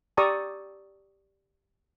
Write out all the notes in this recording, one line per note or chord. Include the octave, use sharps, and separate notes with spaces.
G4 D5 A#5 C#6 D#6 E6